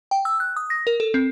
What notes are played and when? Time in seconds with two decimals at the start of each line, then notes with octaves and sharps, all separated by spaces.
0.11 G5
0.25 E6
0.40 F#6
0.56 D#6
0.70 A#6
0.87 A#4
1.00 A4
1.14 C4